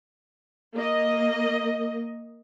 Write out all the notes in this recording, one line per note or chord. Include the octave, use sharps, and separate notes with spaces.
A#3 D#5